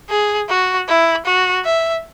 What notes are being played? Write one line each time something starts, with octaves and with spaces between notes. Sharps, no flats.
G#4
F#4
E4
F#4
E5